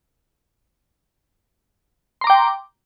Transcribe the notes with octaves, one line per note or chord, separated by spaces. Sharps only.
G5 A#5 C6 D6